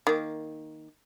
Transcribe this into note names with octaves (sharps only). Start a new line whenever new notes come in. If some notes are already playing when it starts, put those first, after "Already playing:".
D#3 A#3